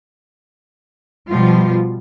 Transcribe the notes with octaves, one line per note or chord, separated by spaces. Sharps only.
B2 F3 G3 F4